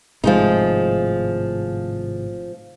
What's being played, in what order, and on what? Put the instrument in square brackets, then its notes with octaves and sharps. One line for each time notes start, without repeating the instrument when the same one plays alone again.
[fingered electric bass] G#1 A2 C3 [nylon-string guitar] F3 G#3 D#4